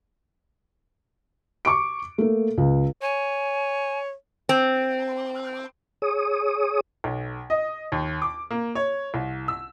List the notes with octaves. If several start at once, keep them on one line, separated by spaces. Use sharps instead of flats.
C#6 D6 D7
A3 A#3
C#2
C#5 G#5
C4
G#4 C#5 D#6
B1
D#5
D#2
D6
A#3
C#5
C2
E6